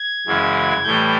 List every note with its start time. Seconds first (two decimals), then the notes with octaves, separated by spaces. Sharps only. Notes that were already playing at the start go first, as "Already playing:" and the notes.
Already playing: G#6
0.27 F#2 C#3 E3 G#3
0.84 A2 E3 G3 G6